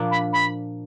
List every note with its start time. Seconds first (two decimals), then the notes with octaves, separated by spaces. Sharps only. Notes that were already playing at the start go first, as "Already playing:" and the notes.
Already playing: A#2 F3 A#3 D4
0.11 B5
0.33 B5